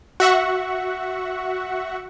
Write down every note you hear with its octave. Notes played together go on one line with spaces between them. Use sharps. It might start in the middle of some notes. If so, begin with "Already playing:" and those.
F#4 E5 F#5 C#6